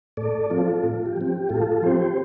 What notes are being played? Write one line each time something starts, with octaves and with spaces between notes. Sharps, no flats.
A2 A4 D5
F3 C4 F4 A4
A2 F4
G4
F3 C4
G4
A2 F4 A4
F3 C4 G4 C5